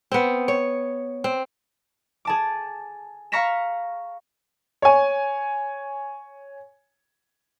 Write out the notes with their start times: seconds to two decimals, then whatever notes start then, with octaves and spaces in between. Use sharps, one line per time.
0.12 B3 C4
0.48 C#5
1.24 C4
2.25 G#4 A5 D6
3.32 F5 A#5 C#6 A#6 B6 E7
4.82 C#5 G#5